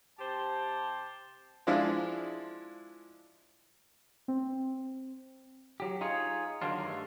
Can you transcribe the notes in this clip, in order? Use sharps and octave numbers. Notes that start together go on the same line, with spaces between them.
C3 G4 C5 A5
F3 G#3 D4 E4 F4
C4
F#3 G4
D#4 F4 G#4 C#5
D3 D#3 F#3 D4 F4
G2 A3